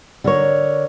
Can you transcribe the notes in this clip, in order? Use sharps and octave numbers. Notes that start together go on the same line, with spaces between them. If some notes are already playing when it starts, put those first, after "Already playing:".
D3 A#4 C#5